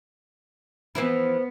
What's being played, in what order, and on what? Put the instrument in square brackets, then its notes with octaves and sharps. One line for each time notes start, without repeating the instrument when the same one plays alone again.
[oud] E3 F3 E4 [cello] B3